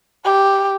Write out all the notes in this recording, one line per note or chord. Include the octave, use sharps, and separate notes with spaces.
G4